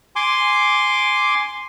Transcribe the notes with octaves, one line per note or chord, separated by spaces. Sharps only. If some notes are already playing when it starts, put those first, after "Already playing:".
G#5 C6 D6